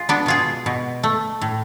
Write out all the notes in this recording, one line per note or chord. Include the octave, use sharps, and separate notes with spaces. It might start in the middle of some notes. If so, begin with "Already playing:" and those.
Already playing: G#3 F4
B3 D4
B2 F4 G#4
B2
A3
A2